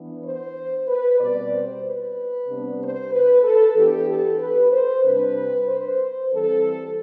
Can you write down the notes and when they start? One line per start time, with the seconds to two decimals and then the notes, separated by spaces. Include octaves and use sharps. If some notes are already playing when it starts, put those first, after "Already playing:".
Already playing: E3 B3 D4
0.23 C5
0.87 B4
1.19 B2 G3 C4 D5
1.52 C5
1.83 B4
2.47 C3 G3 B3 D4
2.80 C5
3.11 B4
3.43 A4
3.76 E3 B3 D4 G4
4.08 A4
4.39 B4
4.72 C5
5.03 C3 G3 D4 B4
5.67 C5
6.31 E3 G3 C4 A4